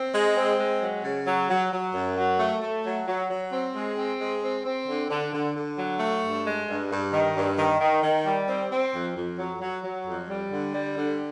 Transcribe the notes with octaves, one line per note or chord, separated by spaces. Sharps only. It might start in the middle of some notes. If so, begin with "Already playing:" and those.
Already playing: C4
G#3
C4
G#3
F#3
C#3
F#3
F#3
F#3
F#2
F#3
A3
A3
F#3
F#3
F#3
C4
G#3
C4
G#3
C4
C4
D3
D3
D3
D3
F#3
A3
G2
G#3
G2
G2
D#3
G2
D#3
D#3
D#3
G3
C4
C4
F2
F2
F#3
F#3
F#3
F2
G3
D3
G3
D3